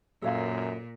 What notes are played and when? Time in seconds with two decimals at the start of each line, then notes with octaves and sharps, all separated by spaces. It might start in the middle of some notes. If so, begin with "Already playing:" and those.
0.22 F#2 A#2 A4 C#5 F5